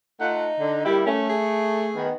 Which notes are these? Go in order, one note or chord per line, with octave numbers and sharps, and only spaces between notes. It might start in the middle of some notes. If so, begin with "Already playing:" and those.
A3 D#4 F4 F#5
D3
G3 A#3 E4 G4
A3 C#4
G#4
D#3 B3